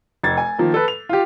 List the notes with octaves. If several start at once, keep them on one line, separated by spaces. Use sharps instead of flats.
F1 G#6 A6
G#5
D#3 F3 A#3
A4 B4
F7
F4 G4